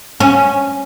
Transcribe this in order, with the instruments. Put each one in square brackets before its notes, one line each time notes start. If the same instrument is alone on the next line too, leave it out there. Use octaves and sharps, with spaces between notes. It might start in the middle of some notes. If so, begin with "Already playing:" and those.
[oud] C#4